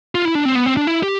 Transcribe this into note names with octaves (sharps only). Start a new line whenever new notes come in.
F4
E4
D4
C4
B3
C4
D4
E4
G4